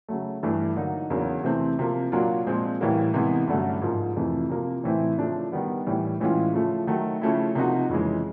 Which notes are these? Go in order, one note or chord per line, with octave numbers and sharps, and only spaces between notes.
C#3 F#3 A3
G2 E3 A3 D4
D3 F#3 A#3 D#4
E2 C#3 F#3 A#3
C3 E3 A3 C4
C3 F3 A#3
A#2 F#3 A#3 D4 F4
A#2 F3 G#3 C4
A2 E3 G3 A#3
C3 E3 G#3 B3
G2 D3 F#3 A3 C#4
G#2 F3 A#3
F2 C3 E3 A3
C3 F3 A#3
A2 E3 A3 C4 E4
C#3 F3 A3 D4
D#3 G3 B3
A2 E3 G3
A2 E3 G#3 C#4 F4
C#3 F3 A3
D#3 F#3 A3
C#3 F3 A3 C#4 E4
C3 F3 A#3 D#4 F#4
F2 C#3 E3 G#3